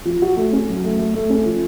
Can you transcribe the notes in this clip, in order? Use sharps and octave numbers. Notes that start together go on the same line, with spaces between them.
F3
F#4
A3
C#4
F#3
A3
A3
A3
C#4
F3